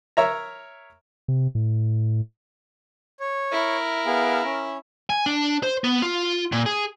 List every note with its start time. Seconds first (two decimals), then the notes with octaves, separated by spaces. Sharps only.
0.17 A#4 C#5 E5 A#5
1.28 C3
1.55 A2
3.20 C#5
3.52 E4 A#4
4.06 B3 G#4 F5
4.44 C#4
5.10 G#5
5.26 D4
5.63 C5
5.84 B3
6.02 F4
6.52 A#2
6.66 G#4